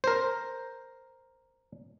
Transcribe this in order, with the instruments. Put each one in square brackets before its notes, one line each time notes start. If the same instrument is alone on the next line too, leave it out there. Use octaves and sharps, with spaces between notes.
[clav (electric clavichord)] A#4 C5